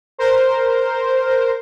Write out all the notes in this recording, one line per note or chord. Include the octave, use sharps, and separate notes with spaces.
A#4 C5